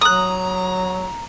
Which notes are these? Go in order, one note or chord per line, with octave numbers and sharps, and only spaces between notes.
F#3 A#5 D#6 F#6